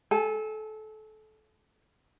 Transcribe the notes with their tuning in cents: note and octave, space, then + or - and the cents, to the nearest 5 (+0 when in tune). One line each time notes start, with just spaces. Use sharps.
A4 -25 G#5 +0